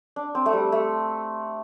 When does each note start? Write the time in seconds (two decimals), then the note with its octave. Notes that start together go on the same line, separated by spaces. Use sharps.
0.16 D4
0.35 C4
0.46 A3
0.53 G3
0.72 A3